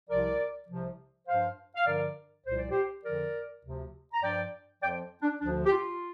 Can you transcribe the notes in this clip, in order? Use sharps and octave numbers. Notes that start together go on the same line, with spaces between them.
C2 C3 F3 A#4 D5
C2 C3 F3
G2 F3 C5 F5
F5
G2 D3 F3 A#4 D5
C2 A#2 F3 C5
D5
G4 C5
F2 D3 F3 A#4 D5
D2 C3 F3
A#5
G2 F3 D5 G5
F2 F3 D5 G5
D4
D2 D3 F3 D4
G4
F4